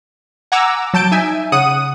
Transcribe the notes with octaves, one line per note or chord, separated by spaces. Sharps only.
F#5 G#5 A#5 D6 E6
F#3 A5 G6 D7
D#4 E5 G#5
C#3 F#5 D#6 D#7